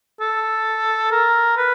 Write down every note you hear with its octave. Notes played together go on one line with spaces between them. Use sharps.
A4
A#4
B4